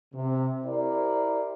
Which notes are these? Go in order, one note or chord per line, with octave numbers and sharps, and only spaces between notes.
C3
E4 G4 A#4 C5 D5